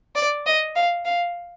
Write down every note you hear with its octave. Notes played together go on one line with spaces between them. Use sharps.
D5
D#5
F5
F5